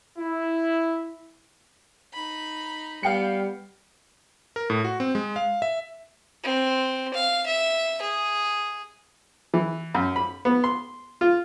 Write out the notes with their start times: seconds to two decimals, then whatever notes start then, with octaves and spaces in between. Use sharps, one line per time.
0.18 E4
2.13 D#4 B5
3.03 G3 B3 F5 G5 C#7
4.56 A#4
4.70 A2
4.84 F#4
5.00 C4
5.15 G#3
5.36 F5
5.62 E5
6.43 C4
7.14 F5
7.47 E5
8.02 G#4
9.54 E3
9.95 F#2
10.16 B5
10.45 B3
10.64 C6
11.21 F4